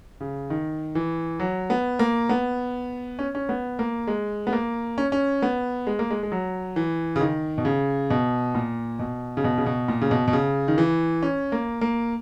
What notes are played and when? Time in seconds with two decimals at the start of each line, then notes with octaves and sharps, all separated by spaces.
0.21 C#3
0.50 D#3
0.95 E3
1.40 F#3
1.70 B3
1.99 A#3
2.29 B3
3.19 C#4
3.35 C#4
3.49 B3
3.79 A#3
4.07 G#3
4.47 B3
4.53 A#3
4.98 C#4
5.12 C#4
5.42 B3
5.87 G#3
5.99 A#3
6.11 G#3
6.23 G#3
6.32 F#3
6.76 E3
7.16 C#3
7.21 D#3
7.58 B2
7.65 C#3
8.10 B2
8.55 A#2
8.99 B2
9.37 C#3
9.44 B2
9.58 C#3
9.66 B2
9.88 A#2
10.01 C#3
10.11 B2
10.28 B2
10.33 C#3
10.68 D#3
10.78 E3
11.22 C#4
11.52 A#3
11.81 A#3